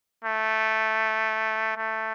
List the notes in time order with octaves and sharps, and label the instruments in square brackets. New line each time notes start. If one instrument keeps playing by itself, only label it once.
[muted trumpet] A3
A3